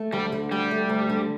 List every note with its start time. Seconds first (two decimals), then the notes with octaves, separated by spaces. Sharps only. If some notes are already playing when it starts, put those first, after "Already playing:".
Already playing: A3
0.12 D2 G3
0.32 D3
0.51 D2 G3
0.71 A3
0.89 D2
1.09 D3